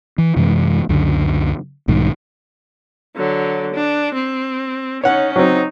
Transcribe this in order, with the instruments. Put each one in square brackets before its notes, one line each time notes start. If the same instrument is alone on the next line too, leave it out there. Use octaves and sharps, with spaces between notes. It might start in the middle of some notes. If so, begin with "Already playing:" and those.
[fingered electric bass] E3
F#2 C3 E3 G#3
C#2 F#2 D3
B1 G#2 D#3 G3
[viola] D3 F#3
D4
C4
[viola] C#4 D#4 [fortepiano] C#5 F#5
[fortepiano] F#3 C4 [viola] D#4